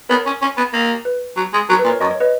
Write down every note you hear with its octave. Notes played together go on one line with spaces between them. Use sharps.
B3 A#4 C#5
C#4
C#4
B3
A#3
B4
F#3
G#3
F#3 A#4
B4
A#2
A#4 C#5
F#2 D#5
C#5
B4 D#5